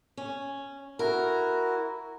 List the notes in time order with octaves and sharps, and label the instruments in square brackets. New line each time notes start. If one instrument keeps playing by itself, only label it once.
[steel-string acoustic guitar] C#4
[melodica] E4 F#4 [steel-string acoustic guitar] A#4